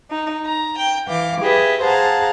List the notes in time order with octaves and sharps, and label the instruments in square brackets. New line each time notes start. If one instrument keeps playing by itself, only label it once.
[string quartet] D#4
A#5
G5
E3 F5 D6
G4 G#4 B4 D#5 E5
G#4 C5 F5 F#5 A5 A#5